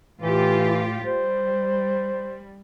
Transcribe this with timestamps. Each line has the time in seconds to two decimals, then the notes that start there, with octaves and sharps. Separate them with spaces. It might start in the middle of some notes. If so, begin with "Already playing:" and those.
0.21 A2 E3 F4 G4
1.05 G3 C5